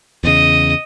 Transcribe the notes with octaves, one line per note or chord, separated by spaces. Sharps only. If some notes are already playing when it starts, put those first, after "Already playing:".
E2 C#3 D#5